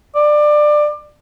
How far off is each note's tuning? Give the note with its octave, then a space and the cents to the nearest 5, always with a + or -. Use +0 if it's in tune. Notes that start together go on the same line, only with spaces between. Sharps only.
D5 +20